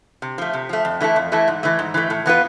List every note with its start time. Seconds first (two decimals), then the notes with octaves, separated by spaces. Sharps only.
0.22 C3
0.38 F3 A3
0.53 C3
0.69 F3 A3
0.85 F2
1.00 E3 A3 E4 A4
1.16 F2
1.32 E3 A3 E4 A4
1.48 G#2
1.63 E3 A3
1.79 G#2
1.94 E3 A3
2.10 A2
2.26 E3 B3 F4 B4